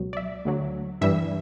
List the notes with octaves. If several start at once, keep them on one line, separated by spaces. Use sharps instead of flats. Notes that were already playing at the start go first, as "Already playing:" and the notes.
Already playing: C#2 B2 F#3
D5
E5
D2 D3 F#3
G2 E3 G3 E5